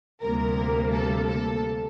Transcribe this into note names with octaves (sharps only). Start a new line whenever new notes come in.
D2 C3 G3 A#3 A#4
A4
A4